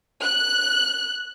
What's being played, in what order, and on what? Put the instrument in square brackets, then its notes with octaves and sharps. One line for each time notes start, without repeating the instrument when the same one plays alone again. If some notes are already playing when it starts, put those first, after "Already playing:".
[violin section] F#6